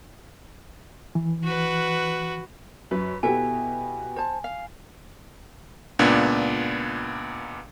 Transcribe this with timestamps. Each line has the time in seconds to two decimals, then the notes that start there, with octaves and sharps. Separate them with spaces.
1.15 E3
1.44 F#4 B4
2.91 F#2 B4
3.23 B2 B3 E4 G4 A4 E5 G#5
4.16 C5 A5
4.44 F5
5.99 C#2 A#2 B3 D4